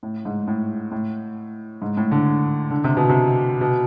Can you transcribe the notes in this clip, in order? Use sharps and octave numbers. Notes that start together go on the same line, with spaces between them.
A2
G#2
A2
A2
G#2
A2
D3
D3
C3
B2
C3
B2